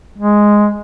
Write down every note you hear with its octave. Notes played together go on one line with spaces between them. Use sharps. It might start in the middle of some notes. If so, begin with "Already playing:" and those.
G#3